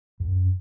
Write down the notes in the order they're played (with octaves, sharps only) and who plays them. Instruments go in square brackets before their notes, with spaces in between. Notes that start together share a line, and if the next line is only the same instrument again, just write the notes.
[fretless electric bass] F#2